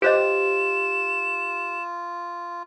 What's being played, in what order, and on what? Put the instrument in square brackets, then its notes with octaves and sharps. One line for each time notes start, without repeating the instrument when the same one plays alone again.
[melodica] F4 [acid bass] G4 [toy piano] B4 C5 D#5 [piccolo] E7